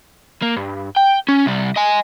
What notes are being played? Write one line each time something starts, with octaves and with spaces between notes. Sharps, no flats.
A#3
G2
G5
C#4
C2 G3
D#5 G#5